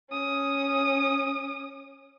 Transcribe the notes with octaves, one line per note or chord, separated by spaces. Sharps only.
C#4 D#6